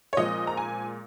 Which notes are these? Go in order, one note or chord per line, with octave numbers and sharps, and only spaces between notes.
C#5
A#2 F3 G#3 C4 D#5
A#5
G#5